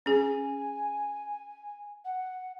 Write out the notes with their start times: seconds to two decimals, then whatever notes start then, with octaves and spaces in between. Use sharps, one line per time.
0.06 C#4 G#4 G#5
2.04 F#5